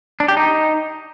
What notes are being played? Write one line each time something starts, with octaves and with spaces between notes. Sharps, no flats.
D4
G4
D#4